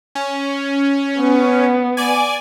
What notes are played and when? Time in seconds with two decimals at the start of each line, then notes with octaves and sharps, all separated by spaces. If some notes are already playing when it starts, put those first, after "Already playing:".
0.15 C#4
1.19 B3
1.97 D5 G#5